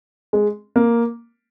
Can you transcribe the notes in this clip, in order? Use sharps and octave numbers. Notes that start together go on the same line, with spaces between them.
G#3
A#3